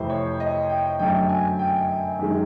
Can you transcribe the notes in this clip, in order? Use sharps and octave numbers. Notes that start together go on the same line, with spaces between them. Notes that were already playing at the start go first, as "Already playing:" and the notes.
Already playing: F2 C3 E3 A3 C5
C#5
D#5
G5
F#2 D3 F#3 A3 G5
G#5
G5
F#2 D#3 G#3